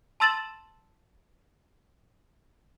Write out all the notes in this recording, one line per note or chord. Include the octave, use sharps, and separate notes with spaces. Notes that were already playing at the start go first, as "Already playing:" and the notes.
A5 C6 E6 A6 E7 F#7